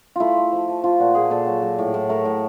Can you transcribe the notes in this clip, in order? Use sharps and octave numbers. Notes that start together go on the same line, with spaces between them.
A3 E4 F4
A3
F3
F3
F3 F4
A#2 F#4
A#2 G#4
A#2 A4
F#3
F#3
A2
A2
A3 A#4
A2